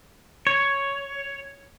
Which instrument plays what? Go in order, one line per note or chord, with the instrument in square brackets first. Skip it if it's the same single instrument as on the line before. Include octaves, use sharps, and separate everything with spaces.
[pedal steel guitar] C#5